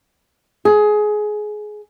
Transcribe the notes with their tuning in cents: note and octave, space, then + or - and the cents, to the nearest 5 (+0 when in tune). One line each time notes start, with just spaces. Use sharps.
G#4 +20